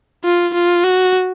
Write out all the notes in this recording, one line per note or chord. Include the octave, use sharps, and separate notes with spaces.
F4
F4
F#4